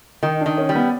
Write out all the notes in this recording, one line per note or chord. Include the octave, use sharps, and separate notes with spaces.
D#3 D#4
D4
D#3
C#4
G3
B3